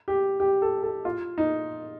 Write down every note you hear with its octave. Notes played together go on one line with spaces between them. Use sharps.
G4
G4
A4
A4
F4
D#4